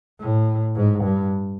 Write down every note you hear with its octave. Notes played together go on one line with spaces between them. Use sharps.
A2
G#2
G2